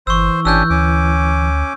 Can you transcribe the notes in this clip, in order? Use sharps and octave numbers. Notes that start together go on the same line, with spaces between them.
G1 E3 C5 C#6 E6
G#1 C#4 D4 G4 E6 F#6 G6
D2 C#4 D6